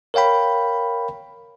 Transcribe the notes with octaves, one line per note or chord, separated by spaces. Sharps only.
A#4 C#5 F5 G5 B5